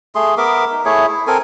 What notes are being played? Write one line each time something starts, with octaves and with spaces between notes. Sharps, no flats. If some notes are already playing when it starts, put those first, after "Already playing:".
A3 G#4 C6
B3 A#4 E5 D6
D#4
A3 E4 G#4 C#5
E4
C4 A4 A#4 G#5